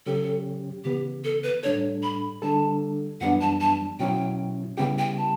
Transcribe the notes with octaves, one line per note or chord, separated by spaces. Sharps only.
C#3 F#3 C#4 G4 A4
C#3 E3 B3 G4
A4
B4
A2 G3 D4 A4 C#5
B5
D3 G3 D4 A4 A5
F#2 E3 G3 B3 D4 F#5
A5
A5
B2 F#3 C#4 E4 G5
C#3 G3 B3 E4 G4 G5
G5
A5